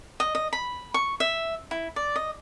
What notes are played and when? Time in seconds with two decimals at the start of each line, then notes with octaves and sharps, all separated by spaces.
0.20 D#5
0.35 D#5
0.53 B5
0.94 C#6
1.20 E5
1.71 E4
1.96 D5
2.16 D#5